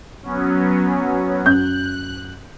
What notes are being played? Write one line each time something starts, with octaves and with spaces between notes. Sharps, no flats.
F#3 B3 C#4
F#2 F#6 G6